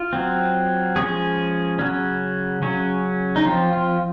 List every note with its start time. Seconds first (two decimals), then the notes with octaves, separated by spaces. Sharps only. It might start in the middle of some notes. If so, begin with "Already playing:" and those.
Already playing: F4
0.13 F#3 C4
0.96 F3 G#3 C#4 G#4
1.79 C#3 F#3 C#4
2.62 C#3 F#3 C#4
3.36 D#4
3.46 F3 C4 F4
3.73 F4